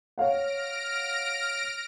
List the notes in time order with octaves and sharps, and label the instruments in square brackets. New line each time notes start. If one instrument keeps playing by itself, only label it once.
[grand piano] C#5 F5 F#5 [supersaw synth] F6 A#6 D7